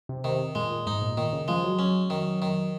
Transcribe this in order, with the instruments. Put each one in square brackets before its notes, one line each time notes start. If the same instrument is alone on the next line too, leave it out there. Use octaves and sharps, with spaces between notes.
[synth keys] C3
[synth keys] C3 [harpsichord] D#3
[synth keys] A#2 [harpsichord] G#3
[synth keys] A#2
[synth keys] G#2 [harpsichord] D#4
[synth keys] A#2
[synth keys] A#2 [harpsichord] D#3
[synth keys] C#3
[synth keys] F3 [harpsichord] G#3
[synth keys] F#3
[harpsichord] C#4
D#3
D#3